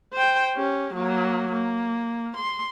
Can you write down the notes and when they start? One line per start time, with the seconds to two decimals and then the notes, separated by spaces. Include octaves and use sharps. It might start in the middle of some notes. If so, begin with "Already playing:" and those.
0.13 C5 G5
0.55 C#4 G4
0.94 F#3 A#3
1.52 A#3
2.37 C6